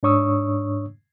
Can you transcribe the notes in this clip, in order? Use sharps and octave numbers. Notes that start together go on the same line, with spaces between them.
G#2 D4 C#5 C#6 D#6 E6